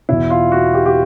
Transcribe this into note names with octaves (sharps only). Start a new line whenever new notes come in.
E2 B2 E4
F4
F#4
G4
G4